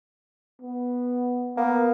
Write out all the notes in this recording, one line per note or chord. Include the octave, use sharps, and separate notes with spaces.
B3
A#3 B3